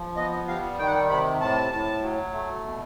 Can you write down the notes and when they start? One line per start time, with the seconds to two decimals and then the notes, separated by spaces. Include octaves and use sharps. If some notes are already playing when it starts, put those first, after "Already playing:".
Already playing: F3
0.16 B3 D#5
0.48 G3 F5
0.78 D#3 G5
0.87 F#5
0.95 G5
1.09 C3 B5
1.41 A2 A5
1.72 A2
2.03 F#3
2.34 A3
2.65 B2